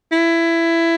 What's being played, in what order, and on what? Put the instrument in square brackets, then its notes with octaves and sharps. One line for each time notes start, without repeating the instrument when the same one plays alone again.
[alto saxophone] E4